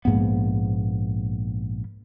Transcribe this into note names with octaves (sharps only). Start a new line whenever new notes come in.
A#1 G#2 A#3 B3